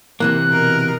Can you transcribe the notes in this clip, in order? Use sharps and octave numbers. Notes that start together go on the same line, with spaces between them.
C3 E3 A#3 F#6
B2 A#4